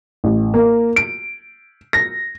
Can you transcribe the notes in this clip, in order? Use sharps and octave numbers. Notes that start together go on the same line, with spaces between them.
A1
A#3
D7
A#6